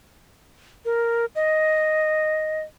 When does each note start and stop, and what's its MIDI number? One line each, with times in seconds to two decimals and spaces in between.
0.85 1.25 70
1.35 2.61 75